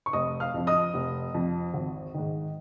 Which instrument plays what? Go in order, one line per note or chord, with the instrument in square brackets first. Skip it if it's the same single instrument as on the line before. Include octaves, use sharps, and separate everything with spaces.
[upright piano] C#6
F1 D#5 D#6
F5 F6
F2 F3
D#5 D#6
F1
F2 F3
G#1
G#2 D#3